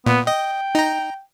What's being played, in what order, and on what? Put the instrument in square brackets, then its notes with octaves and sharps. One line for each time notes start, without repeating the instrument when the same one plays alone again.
[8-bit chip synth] A#2 [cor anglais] B3
[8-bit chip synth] D#5 [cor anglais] G5
[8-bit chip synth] D#4 A#5